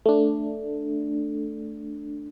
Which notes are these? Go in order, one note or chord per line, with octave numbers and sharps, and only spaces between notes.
A3 D4